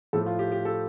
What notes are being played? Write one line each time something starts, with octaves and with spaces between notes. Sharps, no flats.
A2 F3 A3 A4
F4
G4
G4
A4